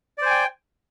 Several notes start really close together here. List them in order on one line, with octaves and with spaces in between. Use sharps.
D5 C5 G#5 G5